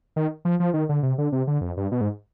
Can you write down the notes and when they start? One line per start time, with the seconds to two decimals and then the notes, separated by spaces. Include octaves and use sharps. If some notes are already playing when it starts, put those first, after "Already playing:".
0.16 D#3
0.45 F3
0.60 F3
0.74 D#3
0.89 D3
1.03 C3
1.18 D3
1.32 C3
1.47 D3
1.61 F2
1.77 G2
1.92 B2
2.01 G#2